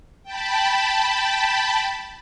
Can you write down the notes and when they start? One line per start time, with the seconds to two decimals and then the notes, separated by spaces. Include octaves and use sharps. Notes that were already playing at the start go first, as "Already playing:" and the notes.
0.23 G5 A5 B5